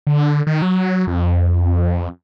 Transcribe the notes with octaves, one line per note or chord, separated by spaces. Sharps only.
D3
D#3
F#3
F2